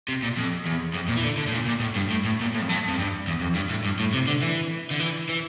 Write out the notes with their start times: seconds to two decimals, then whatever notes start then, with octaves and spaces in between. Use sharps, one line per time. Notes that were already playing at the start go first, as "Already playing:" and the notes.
0.09 C3
0.22 A#2
0.37 F2
0.66 E2
0.95 F2
1.09 A#2
1.17 E3
1.24 D3
1.38 D3
1.48 A2
1.53 A#2
1.68 A#2
1.81 A2
1.96 G2
2.11 A2
2.25 A2
2.40 A#2
2.54 A2
2.61 F2
2.69 G2
2.88 F2
2.98 G2
3.27 E2
3.41 F2
3.55 G2
3.70 A2
3.85 G2
4.00 A2
4.14 C3
4.28 D3
4.42 E3
4.91 D3
5.00 E3
5.29 E3